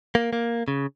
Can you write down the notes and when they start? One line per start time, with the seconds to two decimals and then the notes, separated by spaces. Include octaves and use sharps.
0.15 A#3
0.33 A#3
0.68 C#3